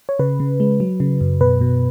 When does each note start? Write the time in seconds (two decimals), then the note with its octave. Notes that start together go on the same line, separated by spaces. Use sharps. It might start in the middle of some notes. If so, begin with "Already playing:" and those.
0.09 C#5
0.19 C#3 B4
0.40 C#3
0.60 G#3
0.80 F#3
1.00 C#3
1.21 F#2
1.41 B2 B4
1.61 B2